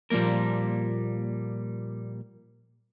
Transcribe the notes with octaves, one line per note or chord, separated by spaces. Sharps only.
A#2 F3 G3 A#3 A#4